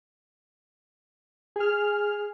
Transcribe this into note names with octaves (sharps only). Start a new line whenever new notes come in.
G#4 F6